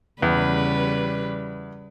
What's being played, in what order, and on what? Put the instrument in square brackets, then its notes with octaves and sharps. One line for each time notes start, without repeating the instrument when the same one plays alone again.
[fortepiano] E2 [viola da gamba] C#3 G3 B4